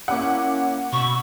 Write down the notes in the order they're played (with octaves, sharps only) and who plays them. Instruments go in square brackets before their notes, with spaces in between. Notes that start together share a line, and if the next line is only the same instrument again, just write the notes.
[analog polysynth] A#3 C#4 E4 [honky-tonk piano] F#5 D6
[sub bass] B2 [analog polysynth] B5 E6 [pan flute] C#6